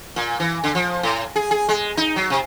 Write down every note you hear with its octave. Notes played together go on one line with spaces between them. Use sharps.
A#2
E3
D3
F3
A2
G#4
G#4
G#3
D#4
F#3
C3